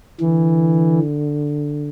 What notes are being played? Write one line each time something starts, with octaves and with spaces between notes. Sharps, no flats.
D3 E3